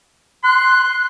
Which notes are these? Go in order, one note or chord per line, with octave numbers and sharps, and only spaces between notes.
C6 F#6